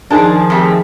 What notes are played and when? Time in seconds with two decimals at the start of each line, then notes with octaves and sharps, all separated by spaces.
0.10 D#3 F3 D4 D#4 G#4 A#4 A5
0.50 F2 A3 G4